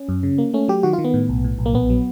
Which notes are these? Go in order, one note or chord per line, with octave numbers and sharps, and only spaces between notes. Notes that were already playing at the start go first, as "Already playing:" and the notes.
Already playing: C#4
F#2
C#3
A#3
A3 C#4
F#3 G4
D#3 F#4
F4
D#3
B3
A2
B1
A2
B1
A#3
A#1 B3
F#3